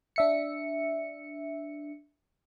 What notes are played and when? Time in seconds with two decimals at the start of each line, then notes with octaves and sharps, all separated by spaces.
0.16 D4 E5 C#7